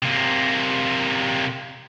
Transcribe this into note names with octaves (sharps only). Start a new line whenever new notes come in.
C3 A#3